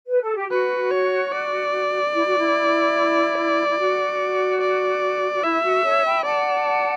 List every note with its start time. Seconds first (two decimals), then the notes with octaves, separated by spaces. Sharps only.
0.09 B4
0.23 A4
0.36 G4
0.50 F#4 B4
0.91 C#5
1.32 D5
2.14 E4
2.26 F#4
2.38 E4
3.69 E4
3.79 F#4
4.61 D5
5.33 F#4
5.43 E4 E5
5.64 F#4
5.83 A4 C#5
6.04 G5 B5
6.25 D5 F#5 A5